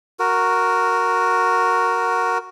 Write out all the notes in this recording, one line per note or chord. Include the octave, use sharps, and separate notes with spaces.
F#4 A#4